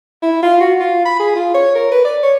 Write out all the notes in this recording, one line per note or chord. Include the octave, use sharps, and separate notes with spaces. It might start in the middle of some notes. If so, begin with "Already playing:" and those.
E4
F4
F#4
F4
B5
G#4
F4
C#5
A#4
B4
D5
C#5